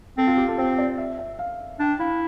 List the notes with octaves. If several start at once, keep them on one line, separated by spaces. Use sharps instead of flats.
C4 A4
F4
G4
A4
C4 C5
D5
E5
E5
F5
D4 G5
E4 F5